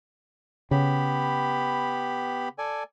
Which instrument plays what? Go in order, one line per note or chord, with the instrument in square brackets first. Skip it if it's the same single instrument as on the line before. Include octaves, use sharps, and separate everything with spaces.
[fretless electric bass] C#3 [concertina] B3 G4 B5
[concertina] A4 D5 G#5